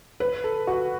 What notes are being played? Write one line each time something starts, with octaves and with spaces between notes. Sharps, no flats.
B4
A4
F#4